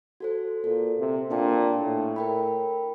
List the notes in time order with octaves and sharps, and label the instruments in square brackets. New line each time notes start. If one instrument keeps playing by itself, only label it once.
[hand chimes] F#4 A4 C5
[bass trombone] A#2 [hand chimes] A4
[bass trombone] C3
[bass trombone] A#2 [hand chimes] D4 G5 A5
[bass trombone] A2
[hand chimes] A#4 G5 B5